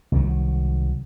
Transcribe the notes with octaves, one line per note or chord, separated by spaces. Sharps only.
C2 D#3 F#3